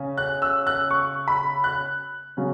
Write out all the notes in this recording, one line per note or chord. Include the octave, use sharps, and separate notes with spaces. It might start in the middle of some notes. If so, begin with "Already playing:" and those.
Already playing: C#3 C#4
F#6
E6
F#6
C#6
B5
F#6
C#3 F#3 C#4